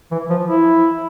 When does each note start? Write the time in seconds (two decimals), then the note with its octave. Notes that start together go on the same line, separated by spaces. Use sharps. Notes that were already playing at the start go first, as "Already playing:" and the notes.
0.11 E3
0.30 F3
0.47 E4